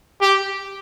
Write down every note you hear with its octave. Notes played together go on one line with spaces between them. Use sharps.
G4